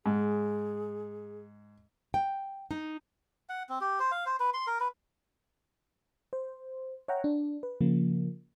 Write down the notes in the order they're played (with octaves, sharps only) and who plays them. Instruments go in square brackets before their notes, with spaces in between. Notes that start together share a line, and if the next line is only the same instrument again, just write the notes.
[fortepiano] G#2 [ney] G#4
[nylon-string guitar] G5
D#4
[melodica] F#5
C4
G4
C5
F5
C5
B4
C6
A#4
B4
[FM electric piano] C5
C#5 E5 F#5 G5 A#5
D4
B4
C#3 F3 A#3